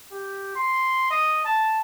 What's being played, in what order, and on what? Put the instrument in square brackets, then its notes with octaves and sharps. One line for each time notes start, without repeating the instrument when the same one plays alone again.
[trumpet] G4
C6
D#5
A5